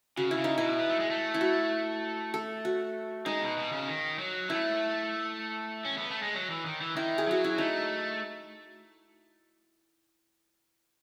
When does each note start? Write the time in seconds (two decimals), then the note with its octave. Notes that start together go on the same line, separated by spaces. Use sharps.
0.17 C#3 F#4
0.31 E4
0.38 C#3
0.44 D#4
0.58 B2 E4
0.79 B3
0.89 A3
1.00 G#3
1.10 A3
1.34 E4
1.41 F#4
2.34 A4
2.65 F#4
3.26 G#3 D#4
3.42 B2
3.57 B2
3.72 C#3
3.88 D#3
4.19 F#3
4.49 A3 E4
5.85 C#4
5.98 B3
6.10 A3
6.22 G#3
6.35 F#3
6.50 E3
6.65 D#3
6.81 E3
6.96 D#3 E4
7.18 G#4
7.27 F#3 F#4
7.44 E4
7.58 A3 D#4